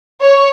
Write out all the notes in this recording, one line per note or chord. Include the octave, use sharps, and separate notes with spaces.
C#5